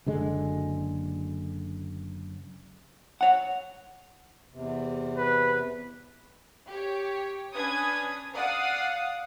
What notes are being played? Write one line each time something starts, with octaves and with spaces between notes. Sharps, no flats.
F#1 D3 G#3
C#5 F#5
E2 C3
B4
G4 C#5
C#4 D4 B4 D#6 G#6
D5 F5 F#5 D#6